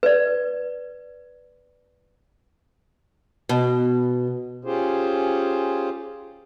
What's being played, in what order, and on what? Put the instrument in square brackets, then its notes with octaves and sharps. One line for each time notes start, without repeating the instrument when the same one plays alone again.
[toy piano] B4 D5
[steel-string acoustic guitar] B2
[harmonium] C#4 F4 G4 G#4 C5